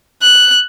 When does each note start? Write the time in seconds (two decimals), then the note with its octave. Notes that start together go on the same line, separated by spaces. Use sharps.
0.22 F#6